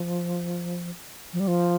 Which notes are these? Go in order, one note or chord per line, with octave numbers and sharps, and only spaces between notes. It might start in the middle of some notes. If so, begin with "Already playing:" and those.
Already playing: F3
F3
G3
F3